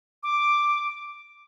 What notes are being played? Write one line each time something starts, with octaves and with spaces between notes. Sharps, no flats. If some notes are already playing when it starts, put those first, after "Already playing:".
D6